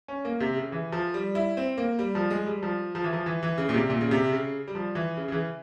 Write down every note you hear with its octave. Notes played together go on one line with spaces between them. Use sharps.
C#4
A#3
C3
C#3
E3
F3
G3
E4
C4
A#3
G3
F3
G#3
G3
F3
F3
E3
F3
E3
E3
C#3
A#2
C3
A#2
C#3
C3
C#3
G3
F3
E3
C#3
C#3
E3